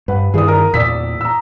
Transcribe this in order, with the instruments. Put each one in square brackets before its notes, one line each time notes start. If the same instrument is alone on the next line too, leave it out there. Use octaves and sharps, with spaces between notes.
[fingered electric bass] G2 [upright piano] B4 F#5
[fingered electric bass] G2 D#3 E3 [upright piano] G#4 D5 D#6
[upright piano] A#4
[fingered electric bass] E2 A#2 [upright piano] D5 E6 B6
[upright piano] A#5 E6